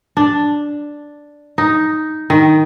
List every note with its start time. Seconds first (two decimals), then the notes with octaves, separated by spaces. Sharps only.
0.17 D4
1.58 D#4
2.30 D#3